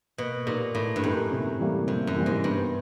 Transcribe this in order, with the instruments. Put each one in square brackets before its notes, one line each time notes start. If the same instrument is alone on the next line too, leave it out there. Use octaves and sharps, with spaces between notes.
[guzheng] B2 [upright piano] A#3
[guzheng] A#2 [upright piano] D#4 G4 A#4
[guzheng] A2 [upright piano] A#3
[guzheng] G2
[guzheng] F#2 [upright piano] D#4 G4 A#4
[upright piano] C3
E3 G3 A#3
[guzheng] F2 [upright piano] C3
[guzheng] F#2
[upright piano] E3 G3 A#3
[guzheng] G#2
[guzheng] G2 [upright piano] B3